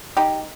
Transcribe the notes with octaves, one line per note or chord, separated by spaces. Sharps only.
D#4 G4